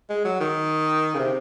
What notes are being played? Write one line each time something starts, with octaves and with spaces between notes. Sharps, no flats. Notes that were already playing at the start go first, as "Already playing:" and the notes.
G#3
F#3
D#3
C#3
C3